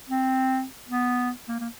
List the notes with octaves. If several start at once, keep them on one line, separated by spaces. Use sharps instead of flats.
C4
B3
A#3
A#3